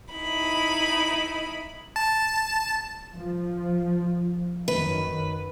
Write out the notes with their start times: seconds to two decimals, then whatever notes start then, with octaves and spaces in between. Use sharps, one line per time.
0.13 D#4 E4 B5
1.96 A5
3.15 F3
4.68 F#2 D#3 B4